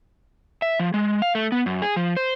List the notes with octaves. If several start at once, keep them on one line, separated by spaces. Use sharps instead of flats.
E5
F3
G#3
F5
A3
B3
F#2
G#4
F3
C5